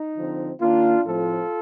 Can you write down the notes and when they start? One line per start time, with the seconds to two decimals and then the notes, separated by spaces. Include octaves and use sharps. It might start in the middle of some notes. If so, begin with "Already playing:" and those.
Already playing: D#4
0.16 D3 F3 C4
0.60 D#3 A#3 D4 F4
1.05 A2 F3 A3 C4 F4 A4